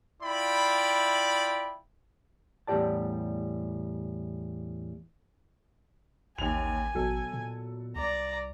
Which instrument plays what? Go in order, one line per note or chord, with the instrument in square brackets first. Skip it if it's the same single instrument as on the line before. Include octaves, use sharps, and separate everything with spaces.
[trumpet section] E4 F4 D5 G5 B5
[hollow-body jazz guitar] E2 A2 G3 G4 D5 A5
[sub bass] A1 [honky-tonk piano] D#2 F7 [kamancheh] G#5
[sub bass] A1 [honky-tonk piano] B2 F#3 A4
[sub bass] A#2
[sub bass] C2 [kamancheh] D5 A#5